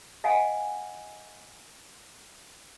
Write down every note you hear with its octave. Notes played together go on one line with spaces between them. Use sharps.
D#5 F5 F#5 G#5